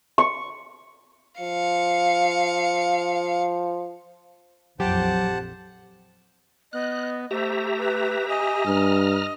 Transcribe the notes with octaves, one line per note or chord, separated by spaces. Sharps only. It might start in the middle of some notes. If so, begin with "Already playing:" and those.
C#6
F3 F5 C#7
A#1 F2 F#3 G4 C5 F#5 A5
B3 D#5 F#6
A3 G4 C5 E5 A#5
B4
D#5 G#5
G2 A#5 F6